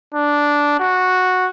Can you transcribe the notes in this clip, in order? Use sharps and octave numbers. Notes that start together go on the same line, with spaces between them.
D4
F#4